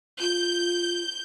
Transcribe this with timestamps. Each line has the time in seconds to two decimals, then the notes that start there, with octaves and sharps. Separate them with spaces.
0.21 F4 G6